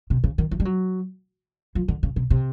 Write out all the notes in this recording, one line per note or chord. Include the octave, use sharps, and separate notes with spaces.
C3
C#3
D#3
E3
G3
F#3
F3
D3
C#3
C3
C3